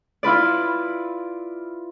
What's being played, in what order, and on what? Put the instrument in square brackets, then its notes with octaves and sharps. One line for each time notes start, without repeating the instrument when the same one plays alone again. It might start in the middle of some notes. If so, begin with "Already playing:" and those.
[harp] E4 F4 B4 D5